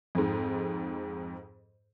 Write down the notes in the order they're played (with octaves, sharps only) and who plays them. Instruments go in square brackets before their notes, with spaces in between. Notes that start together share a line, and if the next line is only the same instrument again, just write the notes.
[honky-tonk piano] F2 G#2